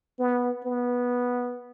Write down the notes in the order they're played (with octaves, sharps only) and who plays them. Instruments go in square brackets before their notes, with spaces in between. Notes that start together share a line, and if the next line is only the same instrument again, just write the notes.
[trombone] B3
B3